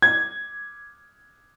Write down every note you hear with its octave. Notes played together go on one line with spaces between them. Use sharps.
G#6